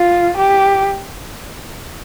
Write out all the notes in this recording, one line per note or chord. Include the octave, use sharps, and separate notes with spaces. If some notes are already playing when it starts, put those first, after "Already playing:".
Already playing: F4
G4